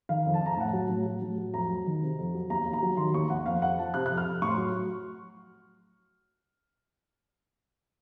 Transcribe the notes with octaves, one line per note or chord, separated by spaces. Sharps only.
D#3 F5
F2
A5
F2 A#5
A5
A2 F#5
F#3 A5
A2
F#3
A2
F#3
F2 A#5
F#3
D#3
C3
F2
F#3
D#2 A#5
D#2
A#5
F#3
D#3 C6
D#2 C#6
D#2 F#5
F2 F5
F2 F#5
F3 A5
C3 F#6
F2 F#6
F6
F2
A2 C#6
C6
F#3 C#6